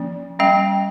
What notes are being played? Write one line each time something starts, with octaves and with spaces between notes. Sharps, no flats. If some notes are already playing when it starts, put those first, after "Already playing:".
Already playing: F3 A#3 C#4
G3 C#4 D#5 G5